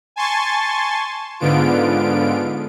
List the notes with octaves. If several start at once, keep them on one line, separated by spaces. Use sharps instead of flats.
G#5 A5 C6 C#6 A6
G#2 D3 B3 F4 D7